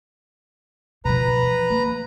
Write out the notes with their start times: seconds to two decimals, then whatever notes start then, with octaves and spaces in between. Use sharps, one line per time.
1.05 B2 F3 B4 A#5
1.70 A#3